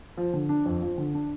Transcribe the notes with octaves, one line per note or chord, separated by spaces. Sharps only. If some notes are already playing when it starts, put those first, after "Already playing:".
F3
D3
D4
F2
F3
D3
D4